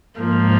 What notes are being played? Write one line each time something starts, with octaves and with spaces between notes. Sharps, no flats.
G#2 F3 A#3